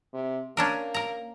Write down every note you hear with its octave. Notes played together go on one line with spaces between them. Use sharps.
C3
A#3 C#4 D4 A#4
A#4 A#5